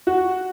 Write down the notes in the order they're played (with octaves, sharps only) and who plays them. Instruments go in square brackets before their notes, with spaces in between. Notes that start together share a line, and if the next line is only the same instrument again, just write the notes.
[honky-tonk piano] F#4